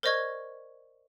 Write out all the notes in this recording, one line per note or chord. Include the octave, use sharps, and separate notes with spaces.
A#4 C5 D5 D#5 C#6 G#6